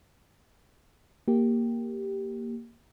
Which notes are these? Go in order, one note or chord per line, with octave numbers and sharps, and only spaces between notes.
A#3 G4